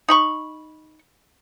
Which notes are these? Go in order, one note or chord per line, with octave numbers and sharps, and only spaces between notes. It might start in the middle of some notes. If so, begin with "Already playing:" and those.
D#4 B5 C#6